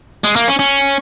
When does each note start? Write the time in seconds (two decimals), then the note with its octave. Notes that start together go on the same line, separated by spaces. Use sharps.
0.24 G#3
0.36 A#3
0.48 C#4
0.59 C#4